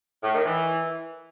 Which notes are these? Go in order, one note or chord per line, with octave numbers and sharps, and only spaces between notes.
A2
D#3
E3